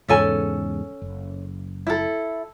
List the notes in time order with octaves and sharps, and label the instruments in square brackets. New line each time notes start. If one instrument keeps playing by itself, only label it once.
[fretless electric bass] E2 G#2 C#3 [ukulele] C#4 A4 G#5
[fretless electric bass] F#1
[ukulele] E4 A4